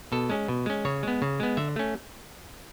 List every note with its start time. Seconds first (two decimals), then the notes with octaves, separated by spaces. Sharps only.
0.12 B2 A4
0.30 G#3 C#4
0.48 B2
0.66 G#3 C#4
0.85 C#3 C#5
1.03 G#3 B3
1.22 C#3
1.40 G#3 B3
1.57 D3 E5
1.76 A3 C#4